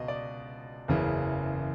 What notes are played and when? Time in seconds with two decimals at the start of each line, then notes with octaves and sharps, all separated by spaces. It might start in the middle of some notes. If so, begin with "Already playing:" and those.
Already playing: C#2 B2 D#5
0.08 D5
0.88 F#1 E2 C#3 E3